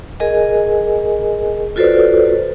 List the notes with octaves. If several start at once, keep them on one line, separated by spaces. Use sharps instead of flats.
G#4 A#4 D#5 G#5
F4 F#4 A4 B4 C5 D5